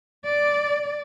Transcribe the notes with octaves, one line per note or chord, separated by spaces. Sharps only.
D5